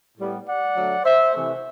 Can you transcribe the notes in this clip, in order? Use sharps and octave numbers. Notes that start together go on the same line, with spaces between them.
A2 G3 B3
D5 F#5
D3 F#3 A3
C5 E5
C3 E3 A3